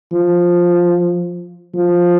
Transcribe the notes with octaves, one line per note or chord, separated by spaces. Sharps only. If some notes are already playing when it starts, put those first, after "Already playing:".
F3
F3